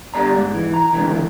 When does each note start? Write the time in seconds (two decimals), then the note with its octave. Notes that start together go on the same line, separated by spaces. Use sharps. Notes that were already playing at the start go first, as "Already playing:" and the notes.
0.14 D3 G3 D5 A#5
0.36 G#2
0.54 E3
0.74 A#5
0.93 C#2 G#2 D3 E3